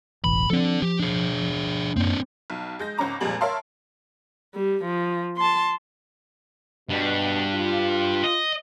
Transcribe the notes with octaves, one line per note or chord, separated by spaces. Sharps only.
E1 A1 E3 B5
F3 G#3 C4 D4 A4
F3 G4
D4 G#4
F#2 A#3 C4 D4
B1
G#3 G6 A#6
G#1 C#2 C#4 A#5 D6
F2 A#2 G3 G#3 F#7
A#4 C#5 E5 F5 A5 C6
G3
F3
A5 C6
G2 B2 G3
F4
D#5